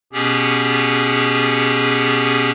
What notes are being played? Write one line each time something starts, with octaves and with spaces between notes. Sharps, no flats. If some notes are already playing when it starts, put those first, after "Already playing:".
B2 B3 C#4 G4 G#4